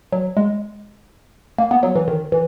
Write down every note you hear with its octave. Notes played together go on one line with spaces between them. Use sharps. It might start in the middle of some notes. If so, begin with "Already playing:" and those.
F#3
G#3
A#3
B3
F#3
E3
D#3
E3